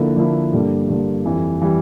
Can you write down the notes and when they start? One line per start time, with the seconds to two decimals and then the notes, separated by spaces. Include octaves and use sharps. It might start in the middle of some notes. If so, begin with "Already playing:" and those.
Already playing: D3 F3 A#3 E4
0.16 D3 F3 A#3 E4
0.52 G2 D3 G3 A#3
0.88 G2 D3 G3 A#3
1.25 F2 E3 G3
1.61 E3 G3